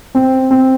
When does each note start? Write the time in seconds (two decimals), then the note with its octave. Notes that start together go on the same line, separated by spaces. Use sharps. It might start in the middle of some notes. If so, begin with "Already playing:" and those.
0.15 C4
0.51 C4